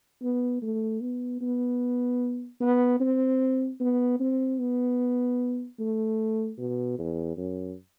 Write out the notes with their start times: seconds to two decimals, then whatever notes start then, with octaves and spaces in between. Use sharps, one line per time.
0.22 B3
0.62 A3
1.01 B3
1.41 B3
2.61 B3
3.00 C4
3.80 B3
4.20 C4
4.59 B3
5.80 A3
6.58 B2
6.98 E2
7.38 F#2